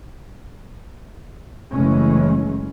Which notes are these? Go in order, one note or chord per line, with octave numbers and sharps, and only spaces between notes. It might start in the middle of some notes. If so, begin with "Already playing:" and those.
F#1 C#3 E3 G#3 A3 C#4